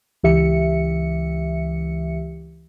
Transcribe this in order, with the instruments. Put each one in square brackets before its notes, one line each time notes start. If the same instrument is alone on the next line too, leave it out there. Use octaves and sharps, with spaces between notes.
[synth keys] C#2 E3 G4 E5 C#7